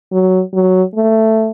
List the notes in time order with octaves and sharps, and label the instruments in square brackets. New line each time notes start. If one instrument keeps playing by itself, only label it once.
[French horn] F#3
F#3
A3